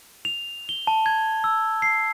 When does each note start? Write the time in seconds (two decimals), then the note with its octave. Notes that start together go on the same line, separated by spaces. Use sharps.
0.25 F7
0.69 G7
0.87 A5
1.06 G#6
1.44 E6
1.82 C7